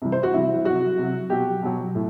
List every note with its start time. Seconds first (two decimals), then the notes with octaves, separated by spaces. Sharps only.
0.02 C3 E3 G3
0.12 C5
0.23 F#4
0.34 C3 E3 G3 E4
0.65 C3 F#3 F#4
0.99 C3 F#3
1.30 B2 F#3 G4
1.62 B2 F#3
1.95 A2